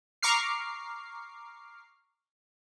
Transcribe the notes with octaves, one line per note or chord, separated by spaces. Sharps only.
A#5 C#6 D6 F6 C7